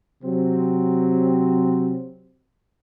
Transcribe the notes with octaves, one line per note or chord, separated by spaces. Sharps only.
C3 F#3 C4